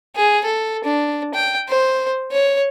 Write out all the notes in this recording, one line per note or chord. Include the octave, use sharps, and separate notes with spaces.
G#4
A4
D4
G5
C5
C#5